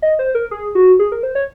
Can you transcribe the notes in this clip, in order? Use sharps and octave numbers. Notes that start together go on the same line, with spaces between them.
D#5
C5
A#4
G#4
F#4
G#4
A#4
C5
C#5